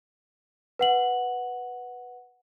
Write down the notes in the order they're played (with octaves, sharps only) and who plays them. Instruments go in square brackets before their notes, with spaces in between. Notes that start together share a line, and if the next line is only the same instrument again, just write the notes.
[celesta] B4 F#5 F#7